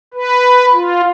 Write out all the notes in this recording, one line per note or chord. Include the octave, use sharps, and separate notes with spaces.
B4
F4